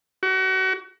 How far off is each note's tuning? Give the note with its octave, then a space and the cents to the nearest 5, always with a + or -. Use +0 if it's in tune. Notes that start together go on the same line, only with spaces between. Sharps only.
F#4 +35